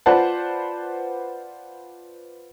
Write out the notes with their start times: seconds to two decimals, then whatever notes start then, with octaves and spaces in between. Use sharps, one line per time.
0.06 F4 B4 C5 D5 F#5 A5